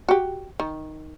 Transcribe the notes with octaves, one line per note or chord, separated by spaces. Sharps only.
F#4 G4
D#3